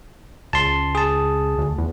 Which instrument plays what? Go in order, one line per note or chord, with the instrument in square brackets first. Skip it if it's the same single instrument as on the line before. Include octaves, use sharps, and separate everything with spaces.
[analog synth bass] C#2 [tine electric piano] A5 C6
[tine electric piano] G#4 A5
[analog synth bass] D2
E2